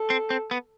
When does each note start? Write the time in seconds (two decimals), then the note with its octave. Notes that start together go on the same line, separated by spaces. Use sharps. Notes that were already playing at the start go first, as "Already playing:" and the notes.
Already playing: A4
0.10 C4
0.30 C4
0.51 B3